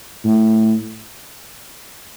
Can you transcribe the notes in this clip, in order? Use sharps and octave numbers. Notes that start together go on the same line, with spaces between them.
A2